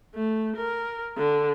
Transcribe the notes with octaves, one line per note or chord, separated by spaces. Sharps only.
A3
A#4
D3